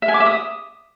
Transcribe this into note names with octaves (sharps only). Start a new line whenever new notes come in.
E5
G#5
D6
E5
D#6